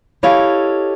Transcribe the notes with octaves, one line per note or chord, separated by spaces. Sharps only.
E4 G4 A4 C#5 D#5 F5